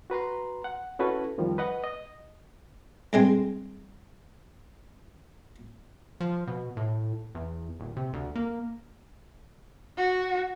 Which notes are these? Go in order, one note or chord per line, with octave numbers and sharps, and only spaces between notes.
F#4 B4 A#5 C6
F#5
C#4 E4 F#4 A4 B4
F2 D#3 F3 G3
B4 D#5 F#5
D#5
G2 G#3 C4
F3
B2
A2
E2
D#1
C3
D2
A#3
F#4